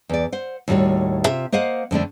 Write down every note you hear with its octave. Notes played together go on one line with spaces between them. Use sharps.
E2 D5
C5 F#5
D#2 A2 G3 F#4 C#5
C3 F4 E5
A#3 C5 D#5 F5 F#5
F2 D3 A3 D4